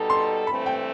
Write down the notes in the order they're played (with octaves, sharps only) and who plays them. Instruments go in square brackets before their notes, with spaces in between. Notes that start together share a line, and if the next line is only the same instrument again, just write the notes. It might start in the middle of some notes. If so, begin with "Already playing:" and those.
Already playing: [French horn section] B2 G3 D#4 A4
[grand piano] C6
[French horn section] G2 E3 A3 C4 [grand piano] B5
[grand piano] G5